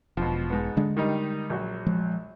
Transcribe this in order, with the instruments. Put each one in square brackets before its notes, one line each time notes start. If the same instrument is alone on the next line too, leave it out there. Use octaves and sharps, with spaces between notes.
[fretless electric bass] E1 [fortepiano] B2 F3
[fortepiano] G#2 B3
[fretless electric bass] D3 G#3 D4
[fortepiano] D#3 G3 D#4
A#1 F#3 F#4
[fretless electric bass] F3 G#3